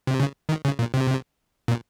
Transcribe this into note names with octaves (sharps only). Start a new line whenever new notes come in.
C3
C#3
D#3
C#3
A#2
C3
A#2